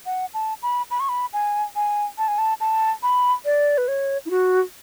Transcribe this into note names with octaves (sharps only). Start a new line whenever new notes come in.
F#5
A5
B5
B5
C#6
B5
G#5
G#5
A5
G#5
A5
A5
B5
D5
B4
C#5
E4
F#4